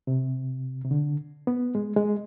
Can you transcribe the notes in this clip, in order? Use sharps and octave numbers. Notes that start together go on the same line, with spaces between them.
C3
C3
D3
B3
G#3
G#3